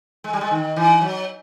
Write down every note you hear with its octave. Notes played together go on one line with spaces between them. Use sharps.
G#3
G3
G#3
D#3
E3
F#3